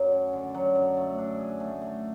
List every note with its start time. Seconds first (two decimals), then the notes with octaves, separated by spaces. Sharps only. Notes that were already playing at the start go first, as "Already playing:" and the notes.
Already playing: F#2 F#3
0.12 C#4
0.33 D3
0.55 F#3
0.75 F#2
0.97 A3
1.18 D4
1.39 G#4
1.60 A3
1.81 A3